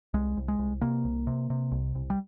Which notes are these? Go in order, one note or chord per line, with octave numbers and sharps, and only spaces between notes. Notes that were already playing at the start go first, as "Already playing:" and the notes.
C2 G#3
C2
G#3
C2
C3 A#3
C2
C3
C3
C2
C2
G3